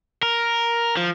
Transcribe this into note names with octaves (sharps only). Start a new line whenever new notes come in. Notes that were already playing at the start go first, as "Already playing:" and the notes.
A#4
F3